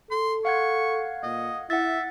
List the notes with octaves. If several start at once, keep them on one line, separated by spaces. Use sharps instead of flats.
A4 C6
F5 F#5 C#6 G#6
A#2 D#5
E4 E5 F#5 A6